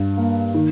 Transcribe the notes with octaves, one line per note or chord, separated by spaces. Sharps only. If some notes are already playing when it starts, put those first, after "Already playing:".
Already playing: G2
A#3
D#3